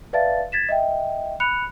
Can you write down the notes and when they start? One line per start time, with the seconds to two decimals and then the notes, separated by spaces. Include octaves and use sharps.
0.13 B4 D5 E5 F5 A5 A6
0.52 G#6 A6 B6 E7
0.69 D#5 E5 G5
1.40 B5 F#6 C#7 F7